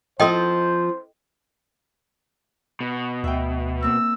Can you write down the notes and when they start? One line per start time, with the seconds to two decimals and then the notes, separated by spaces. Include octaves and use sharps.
0.20 F3 C4 A4 C5 D#5 G5
2.80 B2
3.24 D2 E5 G5
3.83 A#3 C4 E6